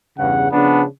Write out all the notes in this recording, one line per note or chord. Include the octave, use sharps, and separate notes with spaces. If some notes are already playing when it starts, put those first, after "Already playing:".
E2 G2 C#3 F#5
C#3 F3 B3 D4